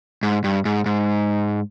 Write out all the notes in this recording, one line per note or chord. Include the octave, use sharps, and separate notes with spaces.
G#2
G2
G#2
G#2